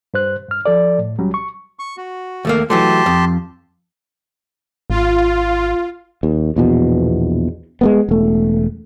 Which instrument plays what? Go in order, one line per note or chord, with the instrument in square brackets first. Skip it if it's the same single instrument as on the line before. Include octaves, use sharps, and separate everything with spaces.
[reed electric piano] G2 C5 F#6
G2 F6
F3 A4 D5
A2
C#2 F#3 G3 C#4
C#6
[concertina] C#6
F#4
[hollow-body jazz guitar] D#2 A3 A#3
[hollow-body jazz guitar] E3 F#3 A3 [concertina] G4 A5 C6
[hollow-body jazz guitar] F2
[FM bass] G#1 [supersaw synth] F4
[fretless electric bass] D#2
A#1 E2 B2
G#3 A#3 B3
E1 A3